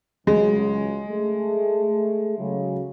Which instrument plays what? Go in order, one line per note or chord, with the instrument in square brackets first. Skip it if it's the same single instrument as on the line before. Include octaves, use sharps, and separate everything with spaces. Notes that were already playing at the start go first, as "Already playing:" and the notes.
[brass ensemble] C#2 F#3 [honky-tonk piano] G#3
[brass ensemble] A3 G#4
C#3 F#3